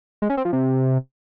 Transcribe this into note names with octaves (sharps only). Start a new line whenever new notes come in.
G#3
C#4
C4
F3
C3